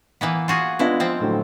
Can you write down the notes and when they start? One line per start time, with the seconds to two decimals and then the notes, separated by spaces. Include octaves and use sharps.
0.21 E3 A#3 B3
0.48 F4 F#4 G#4
0.79 G#3 B3 D4 E4 F4
1.00 F3 C4
1.21 A2 D3 F#3